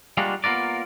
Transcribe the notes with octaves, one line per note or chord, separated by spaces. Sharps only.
G3 G#3 A#3 D4 F4 F#4
A#3 B3 F4 A#4 D5